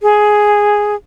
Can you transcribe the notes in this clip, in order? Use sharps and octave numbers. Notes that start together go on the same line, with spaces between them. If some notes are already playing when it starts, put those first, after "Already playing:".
G#4